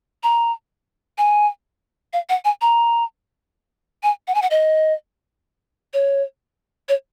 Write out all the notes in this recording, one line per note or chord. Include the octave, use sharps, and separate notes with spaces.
A#5
G#5
F5
F#5
G#5
A#5
G#5
F#5
G#5
F#5
D#5
C#5
C#5